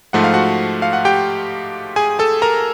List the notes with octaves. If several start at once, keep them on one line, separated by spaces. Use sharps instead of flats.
G#2 F3 A3 F#5
F5
F#4 F#5
F5
F#5
G4 G5
G#4 G#5
A4 A5
A#4 A#5